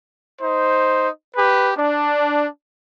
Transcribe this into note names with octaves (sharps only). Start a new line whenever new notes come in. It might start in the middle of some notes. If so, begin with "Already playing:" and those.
D#4 C5
G4 B4
D4